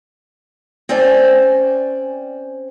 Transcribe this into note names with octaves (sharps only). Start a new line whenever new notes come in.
C4 C#4 C5 D5 G#5